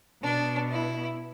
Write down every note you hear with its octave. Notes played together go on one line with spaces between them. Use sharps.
B2 D4
E4